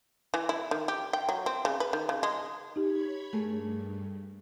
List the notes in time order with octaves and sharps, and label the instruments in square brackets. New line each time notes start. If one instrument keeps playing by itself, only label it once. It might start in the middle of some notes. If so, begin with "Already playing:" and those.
[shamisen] E3
E4
D#3
G4
G5
F#3
C4
C#3
B4
D#3
C#3
G#3
[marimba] D#4 G4 [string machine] C#5 B5 G#6
[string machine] G2 [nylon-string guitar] A3 A#3 G#4